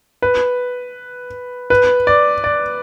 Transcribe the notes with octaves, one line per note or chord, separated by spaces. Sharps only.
B4
B4
D5
D5